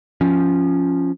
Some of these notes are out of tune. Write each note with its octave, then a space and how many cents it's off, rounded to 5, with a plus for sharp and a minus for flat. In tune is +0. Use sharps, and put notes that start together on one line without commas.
F3 +0 C#4 +0